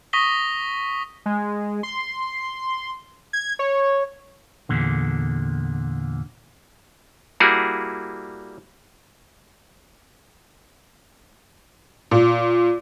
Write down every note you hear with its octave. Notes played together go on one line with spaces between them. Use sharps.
C#6 D#6 A#6 B6 G7
G#3
C6
G#6
C#5
E2 A#2 D3
G3 A#3 E4 F#4 G#4
A#2